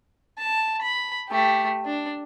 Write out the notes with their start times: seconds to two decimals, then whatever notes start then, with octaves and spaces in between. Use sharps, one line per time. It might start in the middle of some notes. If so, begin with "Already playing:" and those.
0.39 A5
0.82 B5
1.29 A3 G4
1.86 D4